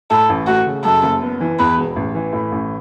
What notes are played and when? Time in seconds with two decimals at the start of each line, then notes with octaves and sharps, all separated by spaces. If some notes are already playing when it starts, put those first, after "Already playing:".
0.10 A2 A4
0.29 A1
0.47 A3 F#4
0.66 C#3
0.84 F#2 A4
1.03 F#1
1.22 B3
1.41 E3
1.59 E2 B4
1.78 E1
1.96 A1
2.14 E3
2.33 A2
2.52 A1